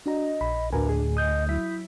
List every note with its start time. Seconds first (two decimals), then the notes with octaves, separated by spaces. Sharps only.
0.06 D4 F#4 D#5 A#5
0.41 A#1 B5
0.73 D2 A2 D4 F#4 A#4 B4 G#5
0.89 G#4
1.17 D#5 D#6 G6
1.49 F#3 E4 E5 B6